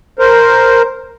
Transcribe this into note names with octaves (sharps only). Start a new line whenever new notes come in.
A#4 C5